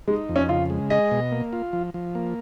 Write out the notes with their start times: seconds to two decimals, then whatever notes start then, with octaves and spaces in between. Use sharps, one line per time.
0.08 G#3 D#4
0.29 F2
0.36 C#4
0.49 C#3 F4
0.70 G#3
0.90 G#4 D#5
1.11 B2
1.32 A#3
1.53 F4
1.73 F3
1.94 F3
2.15 A#3